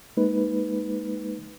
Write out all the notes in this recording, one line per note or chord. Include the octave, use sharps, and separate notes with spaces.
G#3 A#3 D#4 B4